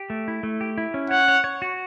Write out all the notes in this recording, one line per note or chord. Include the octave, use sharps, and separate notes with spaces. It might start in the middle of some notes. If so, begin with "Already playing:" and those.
Already playing: G4
A3
E4
A3
G4
E4
C#4
C#5 F#5
C#5
C#5
F#4